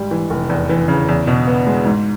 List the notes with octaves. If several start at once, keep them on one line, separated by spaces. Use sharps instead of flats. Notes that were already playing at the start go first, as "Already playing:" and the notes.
Already playing: G#1 G#2 G3
E3
F1
E2
E3
C#3
E2
B2
B3
G#3
G#2